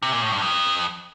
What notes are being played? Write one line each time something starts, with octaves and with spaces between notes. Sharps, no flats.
C3
A#2
A2
G2
F2